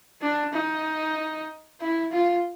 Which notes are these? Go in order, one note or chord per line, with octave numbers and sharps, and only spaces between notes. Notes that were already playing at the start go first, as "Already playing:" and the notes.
D4
D#4
E4
F4